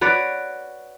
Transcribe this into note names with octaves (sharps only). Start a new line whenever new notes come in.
F#4 B4 C#5 D5